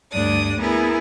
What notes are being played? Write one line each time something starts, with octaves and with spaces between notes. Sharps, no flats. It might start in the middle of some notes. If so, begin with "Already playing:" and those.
D2 G2 D4 D5 D#6
B3 E4 G#4 A#4